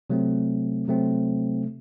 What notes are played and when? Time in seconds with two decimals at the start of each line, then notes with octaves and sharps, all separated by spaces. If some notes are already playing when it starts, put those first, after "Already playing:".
0.10 C3 F#3 A3 C4
0.88 C3 F#3 A3 C4